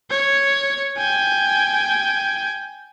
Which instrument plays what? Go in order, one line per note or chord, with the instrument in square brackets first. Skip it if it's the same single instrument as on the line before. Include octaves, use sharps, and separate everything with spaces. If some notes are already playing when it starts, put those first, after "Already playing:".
[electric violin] C#5
G5 G#5